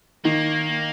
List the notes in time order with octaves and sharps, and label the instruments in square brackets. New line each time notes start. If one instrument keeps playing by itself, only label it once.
[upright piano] D#3 [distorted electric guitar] A#3